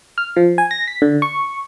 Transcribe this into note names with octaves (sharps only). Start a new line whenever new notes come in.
F6
F3
G#5
A#6
B6
D3
C#6